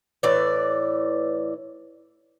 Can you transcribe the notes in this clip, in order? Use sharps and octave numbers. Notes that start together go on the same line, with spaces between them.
A2 E3 D5